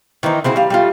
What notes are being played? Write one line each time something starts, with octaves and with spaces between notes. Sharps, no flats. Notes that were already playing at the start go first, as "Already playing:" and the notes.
D#3 E3 C4 D#4
C#3 C4 E4 F#4
G3 F5
G3 A3 F4